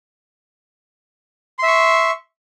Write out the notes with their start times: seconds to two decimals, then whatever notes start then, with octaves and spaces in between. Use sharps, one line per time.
1.59 C6
1.63 E5
1.67 C#6